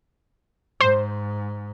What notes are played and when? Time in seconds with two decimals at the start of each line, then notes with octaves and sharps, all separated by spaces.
0.81 G#2 C5